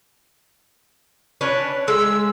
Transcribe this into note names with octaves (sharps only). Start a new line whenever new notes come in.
C#4 D4 B4
G#3 E6